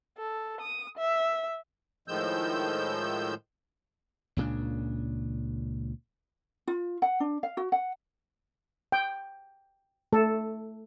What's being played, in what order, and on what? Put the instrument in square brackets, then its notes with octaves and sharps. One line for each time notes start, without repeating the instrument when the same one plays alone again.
[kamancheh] A4
D#6
E5
[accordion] A2 D#3 F3 G#3 E6 G6
[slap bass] C#2 A#2 C#3 D4
[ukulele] F4
F#5
D4
F5
F#4
F#5
[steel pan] G5
A3 A4